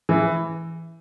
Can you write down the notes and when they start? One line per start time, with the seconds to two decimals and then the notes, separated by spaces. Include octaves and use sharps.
0.09 E3